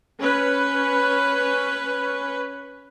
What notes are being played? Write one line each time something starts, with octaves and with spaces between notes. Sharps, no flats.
C#4 B4